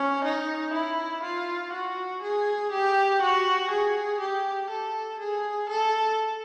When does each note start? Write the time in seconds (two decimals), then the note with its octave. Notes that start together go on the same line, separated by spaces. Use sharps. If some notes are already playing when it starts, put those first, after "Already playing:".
Already playing: C#4
0.24 D#4
0.74 E4
1.23 F4
1.73 F#4
2.23 G#4
2.72 G4
3.22 F#4
3.71 G#4
4.20 G4
4.70 A4
5.19 G#4
5.69 A4